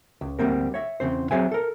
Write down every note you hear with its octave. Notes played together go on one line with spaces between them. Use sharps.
C#2
D2 G3 A#3 C4 A#4
C#5 E5
E2 C#3 C4 C5
F#3 C4 G#4 C5 E5 G#5
A4 A#4